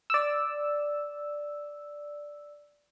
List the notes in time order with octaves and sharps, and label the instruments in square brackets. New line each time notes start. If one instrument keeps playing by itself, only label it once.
[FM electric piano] D5 E6